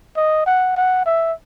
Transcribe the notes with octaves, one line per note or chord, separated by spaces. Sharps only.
D#5
F#5
F#5
E5